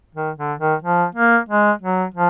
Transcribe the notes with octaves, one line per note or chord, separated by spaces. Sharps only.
D#3
D3
D#3
F3
A#3
G#3
F#3
F3